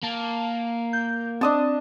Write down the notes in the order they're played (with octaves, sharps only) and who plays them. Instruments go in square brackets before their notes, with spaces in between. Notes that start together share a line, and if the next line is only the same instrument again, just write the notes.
[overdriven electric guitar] A#3 [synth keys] A5
[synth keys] G6
[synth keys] C4 [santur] D4 D#5 A5